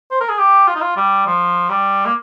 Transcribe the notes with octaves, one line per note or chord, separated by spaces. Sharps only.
C5
A#4
G#4
G4
F4
D#4
F4
G3
F3
G3
A#3